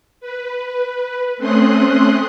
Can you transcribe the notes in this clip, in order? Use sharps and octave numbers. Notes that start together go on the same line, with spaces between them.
B4
A3 C4 C#4 C6 D#6 F#6